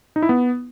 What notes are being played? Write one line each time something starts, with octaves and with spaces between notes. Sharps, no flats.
D#4
E4
B3